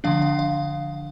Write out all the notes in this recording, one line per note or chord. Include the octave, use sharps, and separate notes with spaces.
D3 F3 D4 F5
F5
F5